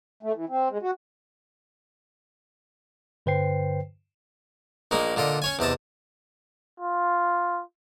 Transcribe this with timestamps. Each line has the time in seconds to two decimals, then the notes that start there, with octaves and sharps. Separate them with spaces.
0.23 A3
0.35 E3
0.49 C4
0.70 G#3
0.82 F#4
3.26 G2 D3 B4 C5 G5 C7
4.91 A#1 G#3 A#3 D#4
5.16 A#2 D3 F4 D#5
5.42 C#4 C#5 G#5
5.59 E2 C3 D#5 A5
6.80 F4